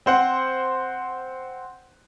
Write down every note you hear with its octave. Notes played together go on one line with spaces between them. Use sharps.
C4 C5 F#5